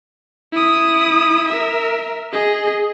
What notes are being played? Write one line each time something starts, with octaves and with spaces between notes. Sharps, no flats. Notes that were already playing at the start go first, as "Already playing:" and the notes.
E4 D#6
A#4 E5
G#4 D#5